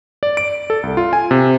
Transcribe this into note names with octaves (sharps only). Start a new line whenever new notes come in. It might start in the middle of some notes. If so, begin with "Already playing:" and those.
D5
D7
A4
C2
F4
G#5
C3